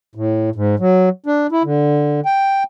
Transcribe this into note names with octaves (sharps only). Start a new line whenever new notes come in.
A2
G#2
F#3
D4
E4
D3
G5